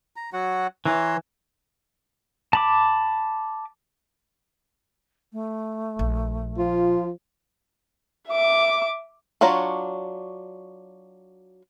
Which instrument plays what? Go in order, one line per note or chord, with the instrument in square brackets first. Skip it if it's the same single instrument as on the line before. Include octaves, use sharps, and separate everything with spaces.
[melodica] A#5
F#3 F#4 F#5
[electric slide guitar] E3 [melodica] C#5 A#5 C6
[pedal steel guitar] A5 B5 D6
[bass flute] A3
[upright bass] A#1
[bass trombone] F3 [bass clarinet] F4
[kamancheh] E5 D6
[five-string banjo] F#3 D4 F4 C#5 A#5